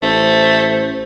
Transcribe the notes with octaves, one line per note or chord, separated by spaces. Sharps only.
A1 A3 C5